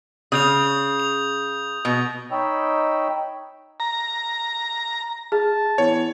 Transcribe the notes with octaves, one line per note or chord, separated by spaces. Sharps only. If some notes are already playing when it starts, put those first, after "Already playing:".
C#3 D#6 G6 F7
F7
B2
D#4 C#5 D#5 G5 B5 E6
A#5
G#4 A5
E2 C#5